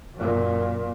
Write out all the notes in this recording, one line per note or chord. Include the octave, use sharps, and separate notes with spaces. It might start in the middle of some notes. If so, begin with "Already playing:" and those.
F#2 A#2